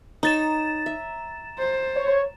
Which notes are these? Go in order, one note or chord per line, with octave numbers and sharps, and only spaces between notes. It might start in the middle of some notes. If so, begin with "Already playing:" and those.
D#4 C#5 A#5 A6 E7
E5
C5
C#5